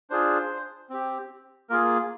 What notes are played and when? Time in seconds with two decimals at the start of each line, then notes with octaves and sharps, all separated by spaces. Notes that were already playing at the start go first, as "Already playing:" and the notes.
0.10 D4 F4 G#4 C5
0.90 C4 G4
1.70 A#3 F4 G#4 A#4